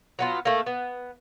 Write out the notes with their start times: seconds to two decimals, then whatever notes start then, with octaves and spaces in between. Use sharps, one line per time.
0.19 F#3 B3 F4
0.45 A3 A#3
0.66 B3